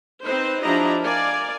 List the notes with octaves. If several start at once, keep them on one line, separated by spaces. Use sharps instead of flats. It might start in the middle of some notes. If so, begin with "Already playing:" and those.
C4 D#4 B4 C5
F3 D4 E4 G4 D#5 A#5
A#4 D5 F5 G#5